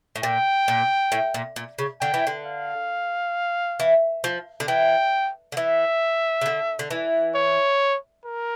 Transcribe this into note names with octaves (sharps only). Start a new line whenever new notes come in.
A2
A#2 G5
A#2
A2
A#2
A#2
C#3
D3 G5
E3
D3
F5
E3
F3
D3
E3 G5
D3
E3 E5
C#3
D3
D3
E3
C#5
A#4